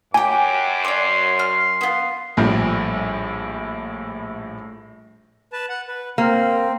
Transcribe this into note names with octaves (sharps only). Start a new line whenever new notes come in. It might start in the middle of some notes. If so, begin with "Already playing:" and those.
F#2 G4 G5 G#5 D6
C#5 D5 C6
F6
B3 F4
A#1 A2 F3 G3
B4 A5
F#5
B4
A#3 C4